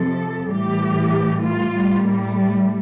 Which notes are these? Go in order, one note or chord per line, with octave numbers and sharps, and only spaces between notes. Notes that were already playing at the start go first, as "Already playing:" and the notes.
Already playing: F2 C3 F3 A4
A2 E3 G3 G4
F4
A2 G3
A#3
A3